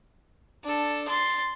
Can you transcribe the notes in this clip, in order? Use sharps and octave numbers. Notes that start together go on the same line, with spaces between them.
D4 A4
C6 A6